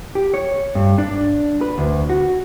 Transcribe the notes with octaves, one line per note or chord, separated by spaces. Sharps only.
G4
C#5
G2
D4
B4
D2
F#4